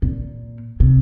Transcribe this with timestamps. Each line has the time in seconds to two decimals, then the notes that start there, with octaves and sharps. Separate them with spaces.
0.02 A#2
0.80 C3